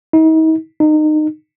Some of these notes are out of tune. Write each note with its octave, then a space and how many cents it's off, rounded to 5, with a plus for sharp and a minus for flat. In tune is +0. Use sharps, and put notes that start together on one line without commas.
D#4 +40
D#4 -25